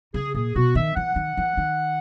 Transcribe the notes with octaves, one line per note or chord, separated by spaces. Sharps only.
C#3 G#4
A#2 G#4
B2 F#4
D#3 E5
E3 F#5
D#3
E3
D#3